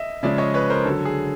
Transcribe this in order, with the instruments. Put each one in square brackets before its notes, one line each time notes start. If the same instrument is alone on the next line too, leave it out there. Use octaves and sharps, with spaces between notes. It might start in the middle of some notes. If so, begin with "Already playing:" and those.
Already playing: [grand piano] D#5 E5
C#3 F3 G#3 D5 E5
C#5 D#5
B4 C#5
A#4 C5
D3 F#3 A4
G#4